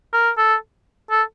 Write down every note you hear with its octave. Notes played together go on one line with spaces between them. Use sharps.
A#4
A4
A4